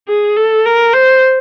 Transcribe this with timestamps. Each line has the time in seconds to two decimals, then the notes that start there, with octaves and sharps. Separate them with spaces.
0.09 G#4
0.36 A4
0.65 A#4
0.94 C5